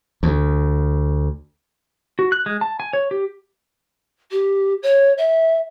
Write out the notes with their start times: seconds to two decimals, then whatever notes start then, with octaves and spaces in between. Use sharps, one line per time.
0.23 D2
2.19 F#4
2.32 F#6
2.46 G#3
2.61 A5
2.80 G#5
2.93 C#5
3.11 G4
4.31 G4
4.83 C#5
5.18 E5